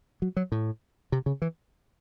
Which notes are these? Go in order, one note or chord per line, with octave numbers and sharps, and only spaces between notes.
F#3
F#3
A2
C3
C#3
E3